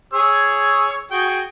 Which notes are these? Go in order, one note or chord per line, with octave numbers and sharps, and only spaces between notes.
G#4 C#5 E6
F#4 G#4 G5